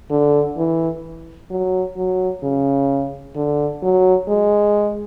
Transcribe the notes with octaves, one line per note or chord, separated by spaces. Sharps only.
D3
E3
F#3
F#3
C#3
D3
F#3
G#3